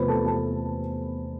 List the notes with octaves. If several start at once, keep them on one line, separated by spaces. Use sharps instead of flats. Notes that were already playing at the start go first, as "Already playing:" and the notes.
Already playing: E2 C3 F3 A3 B4 C5 B5
A4 A5
A4 A5